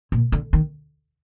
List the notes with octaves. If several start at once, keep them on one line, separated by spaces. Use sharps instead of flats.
A#2
D3
D#3